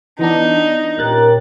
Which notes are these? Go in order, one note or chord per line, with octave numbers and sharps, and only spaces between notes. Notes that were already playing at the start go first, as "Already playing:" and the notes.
E3 B3 D4 D#4
A#2 C#4 G4 A#4 F#6 A6